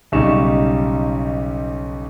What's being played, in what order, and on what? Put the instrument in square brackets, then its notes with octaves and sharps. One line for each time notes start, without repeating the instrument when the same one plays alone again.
[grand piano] B1 C#3 G3 D#4 C#6 E7